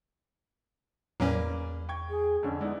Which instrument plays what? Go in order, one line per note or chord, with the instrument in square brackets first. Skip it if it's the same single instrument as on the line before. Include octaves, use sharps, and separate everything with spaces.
[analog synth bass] E2 [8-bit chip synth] A2 F#3 C#4 [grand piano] A#3 B4 D5
[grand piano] G5 C#6 G#6
[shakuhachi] G#4
[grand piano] F2 D3 [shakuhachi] C#4
[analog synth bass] G#3 [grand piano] B3 E4 D5 [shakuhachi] D#4